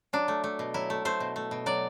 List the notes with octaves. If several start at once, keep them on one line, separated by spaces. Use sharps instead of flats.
F#3 D4
A3
A3
B2
F#3 E4
A3
A3 C5
B2
A3
B2
F#3 D5